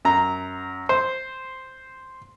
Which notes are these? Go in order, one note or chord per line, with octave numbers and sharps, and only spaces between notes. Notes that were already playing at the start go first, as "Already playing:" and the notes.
F#2 A#5
C5